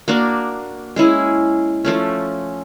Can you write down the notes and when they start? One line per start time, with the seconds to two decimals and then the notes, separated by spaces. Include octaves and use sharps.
0.08 A#3 D4 F#4 A#4
0.96 G#3 C#4 E4 G#4
1.85 F3 A3 C#4